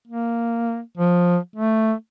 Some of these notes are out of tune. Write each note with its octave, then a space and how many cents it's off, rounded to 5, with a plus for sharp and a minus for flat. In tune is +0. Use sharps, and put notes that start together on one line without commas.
A#3 -5
F3 +15
A3 +5